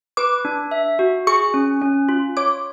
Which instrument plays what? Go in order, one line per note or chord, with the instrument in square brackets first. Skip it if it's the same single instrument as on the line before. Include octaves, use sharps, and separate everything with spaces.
[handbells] B4 [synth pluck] D6
[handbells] D4
E5
F#4
[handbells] G#4 [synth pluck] C#6
[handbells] C#4
C#4
F4
[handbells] C#5 [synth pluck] D6